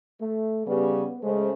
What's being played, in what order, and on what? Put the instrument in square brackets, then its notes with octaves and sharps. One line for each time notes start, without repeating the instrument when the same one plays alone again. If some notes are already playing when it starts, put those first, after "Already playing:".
[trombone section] A3
[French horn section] C#3 G3 [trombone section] B3
[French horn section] C#3 A3 C5 [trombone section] G#3